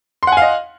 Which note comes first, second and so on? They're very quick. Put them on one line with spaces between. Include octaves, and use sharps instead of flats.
C6 F#5 G#5 F5 D#5